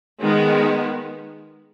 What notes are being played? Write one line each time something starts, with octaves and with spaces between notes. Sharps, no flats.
D#3 G#3 B3